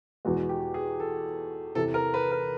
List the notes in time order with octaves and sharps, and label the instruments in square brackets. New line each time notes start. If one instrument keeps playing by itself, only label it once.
[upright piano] E2 B2 G#3 [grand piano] F#4
[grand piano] G4
G#4
A4
[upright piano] E2 C3 E3 [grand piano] A4
[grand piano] A#4
B4
A#4